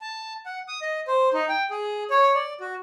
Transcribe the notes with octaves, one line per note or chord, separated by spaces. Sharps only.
A5
F#5
D#6
D#5
C5
D#4
G5
G#4
C#5
D5
F#4